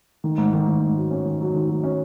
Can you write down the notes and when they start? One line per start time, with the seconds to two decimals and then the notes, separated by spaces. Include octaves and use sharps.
0.24 D#3
0.38 G#2
0.53 D#3
0.67 D#3
0.81 G#2
0.96 F#3
1.11 C#4
1.25 D#3
1.40 F#3
1.54 D#3
1.69 F#3
1.84 C#4